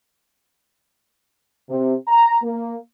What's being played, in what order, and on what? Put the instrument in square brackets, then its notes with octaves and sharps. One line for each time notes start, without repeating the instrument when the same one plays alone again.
[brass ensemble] C3
A#5
A#3